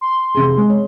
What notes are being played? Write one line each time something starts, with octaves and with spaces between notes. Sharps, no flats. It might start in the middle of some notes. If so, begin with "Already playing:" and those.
C6
F1 C3 G#4
G#3
C#5